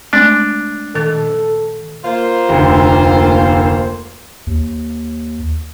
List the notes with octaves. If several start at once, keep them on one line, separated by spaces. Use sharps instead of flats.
G#3 A3 C4 D4
A#2 D#3 A4 A6
A#3 F4 C5
F1 D2
D#2